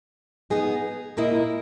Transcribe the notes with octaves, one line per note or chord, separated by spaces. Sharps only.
B3 D#4 G#4
A#2 A#3 E4 A#4 D#5